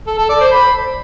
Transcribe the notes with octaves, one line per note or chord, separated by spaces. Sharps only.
A4
A4
D5
C5
B5